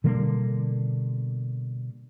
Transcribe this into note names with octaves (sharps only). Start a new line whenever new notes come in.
B2 D3 G3 A#3